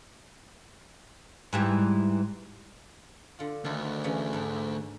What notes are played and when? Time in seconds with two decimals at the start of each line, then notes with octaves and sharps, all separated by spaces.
1.53 G#2 E3 G3
3.39 D3 F4
3.64 D2 D#3 D4
4.04 C#3 E3 C#4
4.33 G#2 D4